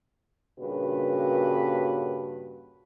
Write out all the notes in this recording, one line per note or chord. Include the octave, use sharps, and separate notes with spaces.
G2 A#2 C#3 F#4 B4